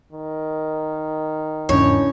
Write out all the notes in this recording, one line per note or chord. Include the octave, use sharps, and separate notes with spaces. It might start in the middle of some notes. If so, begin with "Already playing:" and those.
D#3
E2 G#2 C#3 C#4 D4 E4 C#5